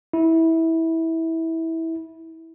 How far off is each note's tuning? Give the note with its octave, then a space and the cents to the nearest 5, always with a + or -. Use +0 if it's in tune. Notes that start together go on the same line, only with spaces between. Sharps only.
E4 -20